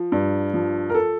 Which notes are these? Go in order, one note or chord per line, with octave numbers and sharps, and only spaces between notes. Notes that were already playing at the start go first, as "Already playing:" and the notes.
Already playing: F3
G2
F3
A#4
A4